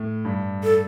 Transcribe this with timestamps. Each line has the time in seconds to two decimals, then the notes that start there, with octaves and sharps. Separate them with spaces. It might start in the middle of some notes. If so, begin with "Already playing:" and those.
Already playing: A2
0.25 G2
0.63 A4